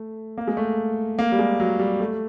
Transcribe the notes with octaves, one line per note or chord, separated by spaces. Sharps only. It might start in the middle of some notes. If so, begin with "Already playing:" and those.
Already playing: A3
A#3
G#3
A3
A#3
G3
G#3
F#3
G3
A3